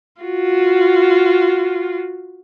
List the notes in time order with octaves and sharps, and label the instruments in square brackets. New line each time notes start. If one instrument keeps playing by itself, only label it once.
[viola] F4 F#4